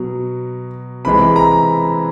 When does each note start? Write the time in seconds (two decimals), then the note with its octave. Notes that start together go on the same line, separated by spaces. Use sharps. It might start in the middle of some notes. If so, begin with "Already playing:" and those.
Already playing: B2 F#3
1.05 C3 E3 G#3 B5
1.36 A#5